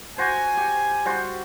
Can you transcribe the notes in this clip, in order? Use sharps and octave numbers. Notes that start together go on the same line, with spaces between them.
F#4 C5 G#5
G4
G3 F#4 C5